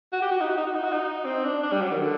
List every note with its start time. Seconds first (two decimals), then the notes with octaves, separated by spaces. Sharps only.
0.12 F#4
0.22 G4
0.31 F#4
0.40 D#4
0.49 F#4
0.57 D#4
0.67 F#4
0.74 D#4
0.84 F#4
0.92 D#4
1.25 C4
1.44 D4
1.63 D4
1.72 G3
1.82 F#3
1.92 D#3
2.01 D3